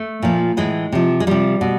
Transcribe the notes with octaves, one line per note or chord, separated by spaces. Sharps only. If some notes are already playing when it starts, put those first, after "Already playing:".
Already playing: A3
A#2 F3
A2 E3 G#3
C3 F3
G#3
C3 F3 G3
B2